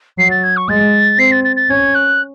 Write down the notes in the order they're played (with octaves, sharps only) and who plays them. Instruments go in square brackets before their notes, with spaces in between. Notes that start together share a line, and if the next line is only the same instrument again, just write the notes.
[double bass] F#3 [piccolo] C7
[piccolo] A6
G#6
C#6
[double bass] G#3 [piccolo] A6
[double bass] C4 [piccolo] C7
[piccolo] A6
A6
A6
[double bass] C#4 [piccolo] G#6
[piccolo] F#6